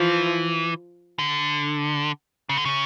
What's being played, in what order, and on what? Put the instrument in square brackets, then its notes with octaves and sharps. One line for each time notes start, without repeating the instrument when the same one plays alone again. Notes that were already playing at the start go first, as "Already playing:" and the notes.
Already playing: [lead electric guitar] E3 [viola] F3
[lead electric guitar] D3
C#3
D3
C#3